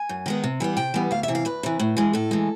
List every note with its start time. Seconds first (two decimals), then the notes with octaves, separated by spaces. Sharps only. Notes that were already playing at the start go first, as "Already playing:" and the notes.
Already playing: G#5
0.09 F#2
0.26 D#3 G#3 B3
0.44 C3
0.60 E3 G3 B3
0.77 C3 G5
0.94 E3 G3 B3
1.11 D2 F5
1.23 E5
1.28 C3 E3
1.35 F5
1.45 D2 B4
1.63 C3 E3
1.79 A2
1.97 E3 G#3
2.13 A2 A4
2.31 E3 G#3